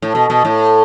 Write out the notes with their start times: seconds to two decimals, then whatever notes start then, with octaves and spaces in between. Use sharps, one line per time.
0.02 A2
0.15 B2
0.30 B2
0.45 A2